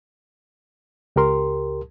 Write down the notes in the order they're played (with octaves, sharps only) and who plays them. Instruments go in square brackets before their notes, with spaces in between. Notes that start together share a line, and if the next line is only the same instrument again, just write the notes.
[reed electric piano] C#2 G4 A#4 C6